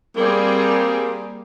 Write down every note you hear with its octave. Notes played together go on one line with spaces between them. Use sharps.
G3 A#3 C4 G#4